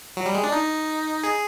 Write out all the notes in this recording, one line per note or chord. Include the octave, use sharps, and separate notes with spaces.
F#3
G3
G#3
D4
D#4
G#4